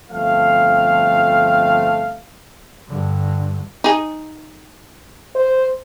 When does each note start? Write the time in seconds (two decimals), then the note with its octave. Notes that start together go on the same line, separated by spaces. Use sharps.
0.10 G1 F3 A3 C4 F5
2.88 G2 D3
3.84 D#4 G#4
5.36 C5